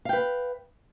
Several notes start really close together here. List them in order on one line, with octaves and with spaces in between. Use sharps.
F5 G5 B4